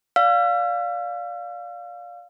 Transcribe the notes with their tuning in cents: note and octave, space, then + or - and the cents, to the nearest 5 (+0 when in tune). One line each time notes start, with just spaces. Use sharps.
D5 -10 F5 +15 E6 +45